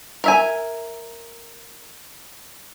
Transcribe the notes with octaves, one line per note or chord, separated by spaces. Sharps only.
A#4 E5 G#5